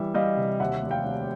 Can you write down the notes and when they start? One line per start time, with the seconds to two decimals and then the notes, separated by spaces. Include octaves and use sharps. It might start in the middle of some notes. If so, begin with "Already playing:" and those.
Already playing: E3 G3 E5
0.14 G3 D#5 F5
0.37 C3
0.60 D#2 E5 F#5
0.83 F1
0.91 F5 G5
1.06 F1